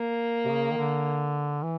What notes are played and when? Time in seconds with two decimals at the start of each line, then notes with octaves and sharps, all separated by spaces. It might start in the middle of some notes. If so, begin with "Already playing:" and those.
Already playing: A#3
0.45 C3
0.50 C#3
0.71 D#3
0.78 D3
1.63 E3